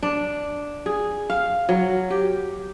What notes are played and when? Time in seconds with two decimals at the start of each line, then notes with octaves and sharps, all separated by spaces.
0.03 D4
0.86 G#4
1.30 F5
1.69 F#3
2.10 G4